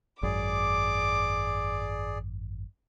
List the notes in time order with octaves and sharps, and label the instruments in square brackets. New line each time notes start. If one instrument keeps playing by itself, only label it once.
[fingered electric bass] G#1 F#2 [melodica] G#4 D5 [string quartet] D6